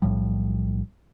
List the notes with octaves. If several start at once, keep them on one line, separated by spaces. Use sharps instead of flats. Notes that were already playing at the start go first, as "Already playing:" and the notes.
B1 A2 F3 G3